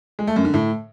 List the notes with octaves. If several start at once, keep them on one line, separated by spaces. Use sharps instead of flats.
G#3
A3
F#2
D3
A2